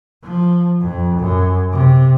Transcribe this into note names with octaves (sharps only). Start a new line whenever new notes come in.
F3
F2
F#2
C3